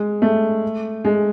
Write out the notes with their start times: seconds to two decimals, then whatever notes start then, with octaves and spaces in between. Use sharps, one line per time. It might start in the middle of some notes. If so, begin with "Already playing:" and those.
Already playing: G#3
0.22 A3
1.04 G#3